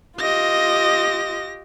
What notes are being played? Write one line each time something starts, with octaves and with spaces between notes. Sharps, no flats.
F4 G4 D#5 A#6